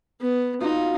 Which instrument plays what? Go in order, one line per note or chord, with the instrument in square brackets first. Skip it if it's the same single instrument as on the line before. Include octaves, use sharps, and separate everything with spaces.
[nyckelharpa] B3
[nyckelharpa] D#4 [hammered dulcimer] F4 F#4